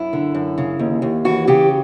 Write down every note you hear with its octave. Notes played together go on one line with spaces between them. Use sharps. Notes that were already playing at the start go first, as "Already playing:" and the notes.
Already playing: F#2 E4
D3
F#2
C#3
D#2
D#2
E3 F#4
C#3 G4